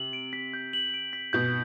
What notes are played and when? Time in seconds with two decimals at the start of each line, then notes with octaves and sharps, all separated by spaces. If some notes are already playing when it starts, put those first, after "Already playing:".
Already playing: C3 F#7
0.13 D7
0.33 B6
0.54 G6
0.73 F#7
0.94 D7
1.13 B6
1.33 B2 G6